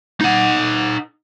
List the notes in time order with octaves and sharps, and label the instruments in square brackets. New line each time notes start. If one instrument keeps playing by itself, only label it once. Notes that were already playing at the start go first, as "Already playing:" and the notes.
[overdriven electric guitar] D#4 F#5